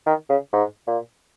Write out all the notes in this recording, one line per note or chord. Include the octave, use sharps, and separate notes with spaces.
D#3
C#3
G#2
A#2